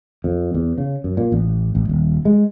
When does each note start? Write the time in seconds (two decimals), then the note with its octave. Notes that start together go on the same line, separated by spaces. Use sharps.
0.24 F2
0.54 E2
0.78 C#3
1.04 F#2
1.17 A#2
1.32 A1
1.75 A1
1.89 D#1
2.25 G#3